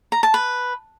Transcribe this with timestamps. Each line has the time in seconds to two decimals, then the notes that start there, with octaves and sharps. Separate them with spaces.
0.12 A#5
0.23 A5
0.34 B4